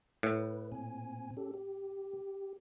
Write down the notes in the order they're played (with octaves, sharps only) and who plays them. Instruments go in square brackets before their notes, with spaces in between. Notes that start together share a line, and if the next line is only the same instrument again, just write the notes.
[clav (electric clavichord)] A2 [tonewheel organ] B4
[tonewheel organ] A#2 C4 G#5
C#4 G4 A4
G4